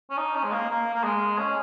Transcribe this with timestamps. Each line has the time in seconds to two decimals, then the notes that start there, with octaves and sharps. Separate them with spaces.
0.10 C#4
0.17 D#4
0.35 C#4
0.44 G#3
0.52 A#3
0.70 A#3
0.94 A#3
1.04 G#3
1.39 C#4